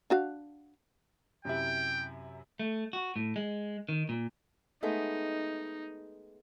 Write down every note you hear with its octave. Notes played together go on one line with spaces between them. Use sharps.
D4 F#4 F5
F#2 C3 E4 G5
A3
F#4
A2
G#3
D#3
A#2
G#3 A3 B3 D#4